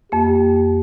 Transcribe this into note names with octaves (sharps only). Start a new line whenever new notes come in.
F2 A#3 G4